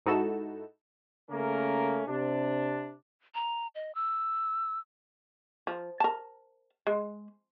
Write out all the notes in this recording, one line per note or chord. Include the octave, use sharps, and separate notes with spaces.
G#2 D#4 E4 F#4 A4 E7
C#3 A3 A#3 C#4 A#4
C3 D4
A#5
D#5
E6
F3
A#4 A5
G#3